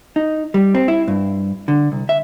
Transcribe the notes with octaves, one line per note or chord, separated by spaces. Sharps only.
D#4
G3
C4
E4
G2
D3
C2
E5